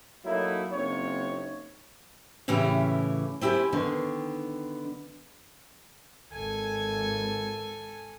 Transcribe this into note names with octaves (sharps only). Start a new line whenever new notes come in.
F#3 A3 A#3 D#4 E4
F#1 C4 D#4 C#5
A2 C#3 E3 C#4 E4 G4
C4 E4 G4 G5 G#5
D3 D#3 B3
G#1 A4 G#5